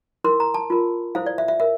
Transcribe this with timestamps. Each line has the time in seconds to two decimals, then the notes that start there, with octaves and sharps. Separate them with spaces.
0.24 E4 A#4 C6
0.40 A#5
0.54 A5
0.70 F4 A#4
1.15 E4 A4 C5 F5
1.26 D5
1.38 E5
1.48 E5
1.60 A#4 E5